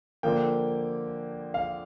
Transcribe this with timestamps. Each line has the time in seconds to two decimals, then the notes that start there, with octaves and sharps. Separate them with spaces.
0.23 D3 F3 A#3 G5
1.54 F5